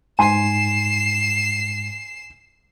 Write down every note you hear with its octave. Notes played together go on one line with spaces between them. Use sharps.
G#2 G#5 C6 C7 D#7 E7